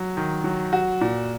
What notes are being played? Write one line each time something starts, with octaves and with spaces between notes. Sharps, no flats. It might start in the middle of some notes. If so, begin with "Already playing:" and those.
Already playing: F#3
D#3
F#3
F#4
A#2